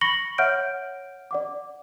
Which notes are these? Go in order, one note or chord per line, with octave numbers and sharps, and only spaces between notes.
B5 C#6 A#6 C#7 F#7 G7
C#5 E5 F#5 F6 G6 D7
D5 F#5 D6